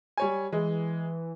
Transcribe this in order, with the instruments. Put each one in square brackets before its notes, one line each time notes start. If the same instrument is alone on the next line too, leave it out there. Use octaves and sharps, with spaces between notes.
[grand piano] G3 C#5 G#5
[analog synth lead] E3 [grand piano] G#3